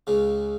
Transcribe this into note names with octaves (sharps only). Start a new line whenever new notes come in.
C#2 C#3